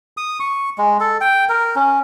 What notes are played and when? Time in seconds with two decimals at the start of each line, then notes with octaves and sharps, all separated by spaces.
0.17 D#6
0.40 C#6
0.78 G#3
1.00 A4
1.21 G5
1.49 A#4
1.76 C#4